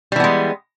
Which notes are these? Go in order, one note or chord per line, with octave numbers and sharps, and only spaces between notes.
E3 G3 G#3 B3